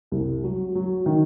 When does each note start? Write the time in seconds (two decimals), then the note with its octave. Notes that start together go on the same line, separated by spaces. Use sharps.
0.12 C2
0.43 F#3
0.75 F#3
1.06 D#3